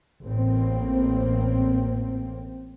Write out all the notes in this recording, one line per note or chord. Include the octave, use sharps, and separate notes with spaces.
A1 A#3 C4